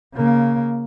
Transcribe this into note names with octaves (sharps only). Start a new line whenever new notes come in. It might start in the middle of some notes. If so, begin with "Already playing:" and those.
C#3 A#3